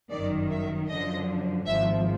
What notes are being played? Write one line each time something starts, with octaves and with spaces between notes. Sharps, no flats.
G1 F#2 D#3 D5
E5
F#2 D3 F3 D#5
G#1 G#2 F3 E5